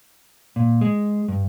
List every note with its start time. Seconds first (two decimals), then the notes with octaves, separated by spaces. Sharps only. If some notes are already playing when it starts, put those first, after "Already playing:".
0.56 A#2
0.81 G#3
1.28 G2